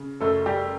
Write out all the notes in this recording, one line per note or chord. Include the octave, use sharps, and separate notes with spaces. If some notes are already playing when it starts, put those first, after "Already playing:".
Already playing: C#3
F#1 A3 A4
G3 G4